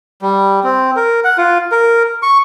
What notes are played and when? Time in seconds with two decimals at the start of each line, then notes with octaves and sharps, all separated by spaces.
0.22 G3
0.64 C4
0.96 A#4
1.24 F#5
1.38 F4
1.72 A#4
2.23 C#6